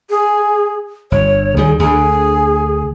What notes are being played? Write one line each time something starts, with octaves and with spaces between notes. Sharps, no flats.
G#4
G1 C#5
D2 D#3 G3 G#4
D2 D3 G#4